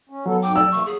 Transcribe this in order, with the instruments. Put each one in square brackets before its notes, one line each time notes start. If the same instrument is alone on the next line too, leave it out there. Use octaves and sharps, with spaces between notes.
[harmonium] C#4
[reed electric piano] F#3 [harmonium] B3 A4
[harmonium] F2 G#2 G5 [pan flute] D6
[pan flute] D5 [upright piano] E6
[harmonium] C3 E3 A#3 [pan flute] C#6
[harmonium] F#3 [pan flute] G#4